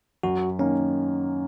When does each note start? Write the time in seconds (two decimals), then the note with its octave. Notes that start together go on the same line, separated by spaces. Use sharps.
0.23 F#2 F#4
0.59 D#3 A#3 C#4